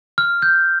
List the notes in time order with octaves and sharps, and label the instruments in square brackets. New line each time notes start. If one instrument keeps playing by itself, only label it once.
[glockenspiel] F6
G6